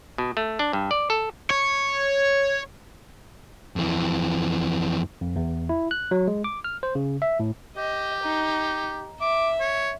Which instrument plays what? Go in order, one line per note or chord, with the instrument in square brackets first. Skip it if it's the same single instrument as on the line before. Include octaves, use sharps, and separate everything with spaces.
[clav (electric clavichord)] B2
A3
D4
G2
D5
A4
[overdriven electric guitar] C#5
[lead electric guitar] F2 E3
[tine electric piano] F2
E2
E4
F#6
F#3
G#3
D6
F6
C5
C#3
E5
A2
[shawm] G4 [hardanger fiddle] D#5
[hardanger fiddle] D#4
[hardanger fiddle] E5 [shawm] D6
[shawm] C#5